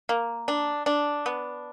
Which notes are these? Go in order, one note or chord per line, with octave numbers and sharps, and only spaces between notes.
A#3
D4
D4
B3